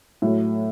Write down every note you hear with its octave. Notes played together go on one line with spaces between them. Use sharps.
A2 F#3 A3